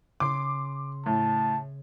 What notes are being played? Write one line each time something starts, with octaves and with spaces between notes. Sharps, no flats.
C#3 C6 D6
A2 A5